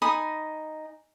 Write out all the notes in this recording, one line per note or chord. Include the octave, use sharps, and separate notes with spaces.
D#4 G#5 B5 D#6